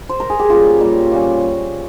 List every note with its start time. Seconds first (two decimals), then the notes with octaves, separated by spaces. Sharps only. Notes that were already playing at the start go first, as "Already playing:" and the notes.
0.09 C5
0.20 A#4
0.30 G#4
0.39 G4
0.50 A#2 G3 A#3 C#4 F4
0.80 A#2 G3 A#3 C#4
1.11 A#2 G3 A#3 C#4